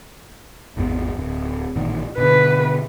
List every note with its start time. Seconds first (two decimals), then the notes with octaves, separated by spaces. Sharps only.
0.77 G#1 E2 B3
1.17 D1
1.76 A1 A#2 D#3
2.18 B2 D3 B4